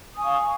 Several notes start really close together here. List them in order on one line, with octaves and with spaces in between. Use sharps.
D#6 G#5 C#6 F5